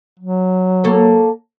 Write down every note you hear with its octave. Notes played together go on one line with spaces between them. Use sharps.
F#3
A#3 A4 C#5